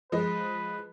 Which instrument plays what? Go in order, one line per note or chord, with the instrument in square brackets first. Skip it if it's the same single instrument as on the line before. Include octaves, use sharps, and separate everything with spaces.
[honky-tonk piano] F3 G#3 D#5 [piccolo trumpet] B4